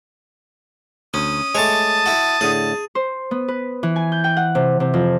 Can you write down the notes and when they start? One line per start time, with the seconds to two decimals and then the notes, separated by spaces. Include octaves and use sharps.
1.14 D2 C#4 D#6
1.55 G#3 A3 C#5 A5 D6
2.06 E4 F#4
2.41 A2 D3 G#4
2.95 C5
3.31 B3
3.48 B4
3.83 E3
3.96 G#5
4.12 G6
4.24 G5
4.37 F#5
4.55 C3
4.80 C3
4.94 F2